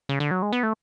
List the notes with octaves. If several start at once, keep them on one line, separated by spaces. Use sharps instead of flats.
C#3
D3
F#3
G#3
B3
A3